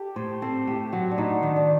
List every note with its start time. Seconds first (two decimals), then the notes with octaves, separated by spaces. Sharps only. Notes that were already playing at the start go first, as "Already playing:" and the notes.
Already playing: G4 A4
0.16 A2 C5
0.42 C4 A4
0.67 A2 G4
0.93 F#3 F#4
1.11 D4
1.18 A2 D#4
1.43 D#3 D4
1.56 D4